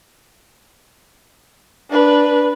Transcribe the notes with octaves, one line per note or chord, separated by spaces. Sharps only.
D4 B4